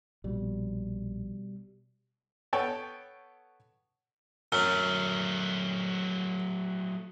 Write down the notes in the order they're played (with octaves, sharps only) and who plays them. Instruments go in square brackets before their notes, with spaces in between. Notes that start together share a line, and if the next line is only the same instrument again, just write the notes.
[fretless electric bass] A#1 [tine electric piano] B2 G3
[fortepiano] B3 A4 C#5 G5
[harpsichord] F#2 [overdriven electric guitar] F#3 A3